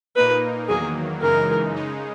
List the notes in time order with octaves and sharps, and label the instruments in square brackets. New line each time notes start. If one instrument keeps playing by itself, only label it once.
[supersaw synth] A#2 A#3 D#4 [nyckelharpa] B4
[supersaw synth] E2 D#3 F#3 A#3 [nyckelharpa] G#4
[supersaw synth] F#2 C#3 E3 G#3 D#4 [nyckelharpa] A#4
[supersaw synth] C#3 G#3 D#4